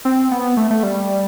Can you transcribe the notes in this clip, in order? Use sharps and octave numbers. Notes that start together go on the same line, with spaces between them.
C4
B3
A3
A3
G3